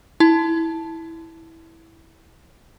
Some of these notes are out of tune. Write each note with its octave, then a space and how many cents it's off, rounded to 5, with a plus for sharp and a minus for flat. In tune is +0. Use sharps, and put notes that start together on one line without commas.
E4 -10 A5 +0